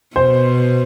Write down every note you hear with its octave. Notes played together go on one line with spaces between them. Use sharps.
B2 C5